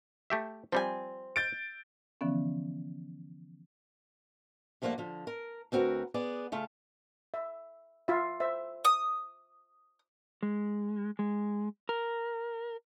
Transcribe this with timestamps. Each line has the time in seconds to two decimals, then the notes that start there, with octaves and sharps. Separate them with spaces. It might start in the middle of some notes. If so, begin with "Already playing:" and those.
0.30 A3 G4 E5
0.72 F3 G3 C4 G#5
1.36 G6 A6 D7
2.21 D3 E3 F3 B3 C#4
4.82 G2 F3 A3 A#3 D5 F#5
4.98 D3 F3
5.27 A#4
5.72 D2 C4 F#4 A#4 B4
6.14 B3 G#4 D5
6.52 C#3 A3 F4
7.34 E5
8.08 F4 E5
8.40 C5 E5
8.85 D#6
10.43 G#3
11.19 G#3
11.89 A#4